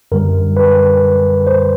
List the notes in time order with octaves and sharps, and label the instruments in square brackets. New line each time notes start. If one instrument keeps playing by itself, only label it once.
[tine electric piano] F#2 D3 G3 A#4
B4
C5